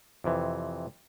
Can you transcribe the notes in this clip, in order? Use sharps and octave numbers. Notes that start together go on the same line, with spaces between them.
F2 C3 E3